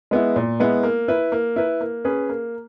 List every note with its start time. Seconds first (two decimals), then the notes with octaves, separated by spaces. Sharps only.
0.11 G#3 B3 E4
0.36 A#2
0.60 G#3 B3 E4
0.83 A#3
1.08 E4 B4
1.32 A#3
1.56 E4 B4
1.81 A#3
2.05 C#4 G#4 B4
2.29 A#3